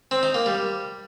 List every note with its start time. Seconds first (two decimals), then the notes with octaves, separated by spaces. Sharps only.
0.11 C4
0.23 D#4
0.34 A#3
0.46 G3